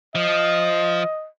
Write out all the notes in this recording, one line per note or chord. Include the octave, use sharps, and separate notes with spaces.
F3 D#5